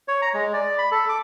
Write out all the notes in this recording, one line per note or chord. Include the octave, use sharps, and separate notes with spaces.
C#5
A#5
G#3
D5
B5
A4
D6